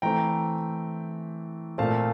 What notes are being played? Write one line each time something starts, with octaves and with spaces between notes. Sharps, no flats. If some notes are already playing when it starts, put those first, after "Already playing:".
E3 A3 C4 G5 A#5
A#2 A3 C4 F5 A5